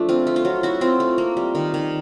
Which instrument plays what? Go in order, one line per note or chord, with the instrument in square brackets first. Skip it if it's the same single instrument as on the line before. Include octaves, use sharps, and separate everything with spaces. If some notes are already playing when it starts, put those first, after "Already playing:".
Already playing: [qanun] F3 A3 D4
C4 F4
A3
F4
F#3
E4 F#4
C4 F4
A3
A#3
G3
D#3
D#3